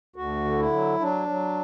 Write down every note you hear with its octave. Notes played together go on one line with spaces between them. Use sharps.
D2 F#4
D3
E4
F#3
F#3 D4
F#3